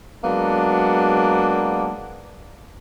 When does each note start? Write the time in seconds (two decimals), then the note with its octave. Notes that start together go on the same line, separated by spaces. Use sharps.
0.24 F#3 G#3 A#3 B3 D4